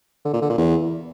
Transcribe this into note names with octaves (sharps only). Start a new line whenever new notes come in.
D3
A#2
D3
A#2
E2